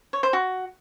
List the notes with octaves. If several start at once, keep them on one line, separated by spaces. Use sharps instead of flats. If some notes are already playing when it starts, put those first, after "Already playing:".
C#5
C5
F#4